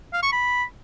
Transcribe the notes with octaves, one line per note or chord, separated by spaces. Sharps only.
F5
C#6
B5